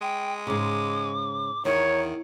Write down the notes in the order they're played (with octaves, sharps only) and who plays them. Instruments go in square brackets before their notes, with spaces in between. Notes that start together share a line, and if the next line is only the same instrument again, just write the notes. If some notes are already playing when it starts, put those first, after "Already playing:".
[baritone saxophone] G#3 [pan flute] G5
[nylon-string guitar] G#2 C#3 [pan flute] D6
[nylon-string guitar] E2 [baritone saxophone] D#3 [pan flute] D#4 [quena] C#5